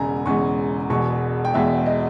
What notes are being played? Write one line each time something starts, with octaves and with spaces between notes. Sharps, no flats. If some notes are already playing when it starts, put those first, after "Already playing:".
Already playing: E1 E2 C#3 G#3 G#5 A#5
E1 E2 C#3 G#3 C#6
E1 E2 B2 G#3 C#6
G5
E1 E2 B2 G#3 E5
D#5